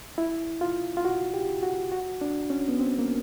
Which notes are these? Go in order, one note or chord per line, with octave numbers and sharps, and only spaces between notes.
E4
F4
F4
F#4
G4
F#4
F#4
D4
C#4
B3
C4
A#3